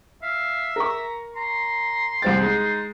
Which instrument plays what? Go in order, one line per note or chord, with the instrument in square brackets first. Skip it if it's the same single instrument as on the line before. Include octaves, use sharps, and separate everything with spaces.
[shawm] E5 [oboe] F5
[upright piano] A#4 C#6 [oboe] A#5
[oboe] A#5 [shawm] C6
[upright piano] C2 C5 A6 [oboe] G5
[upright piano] G#3 [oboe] D#4